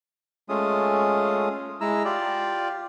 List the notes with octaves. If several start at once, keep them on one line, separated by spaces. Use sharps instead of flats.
G#3 A3 C#4 F4 D#6
G#3 E4 A#5 E6
F4 G4 D5